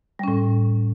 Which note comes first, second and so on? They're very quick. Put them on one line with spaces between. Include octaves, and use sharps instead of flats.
G3 C#4 A2